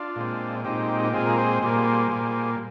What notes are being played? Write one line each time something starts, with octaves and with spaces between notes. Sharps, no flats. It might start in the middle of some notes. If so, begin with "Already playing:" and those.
Already playing: D4 F4
A#2 G#3 C4
A#2 G#3 C4 D#4 G4
G4
A#2 G#3 C4 F4 G#4
A#4
G#4 C5
A#2 G3 A#3 G#4 C5
A#2 G3 A#3